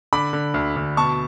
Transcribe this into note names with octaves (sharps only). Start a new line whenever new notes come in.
D3 B5 D6
D3
D2
D2
B2 A5 C#6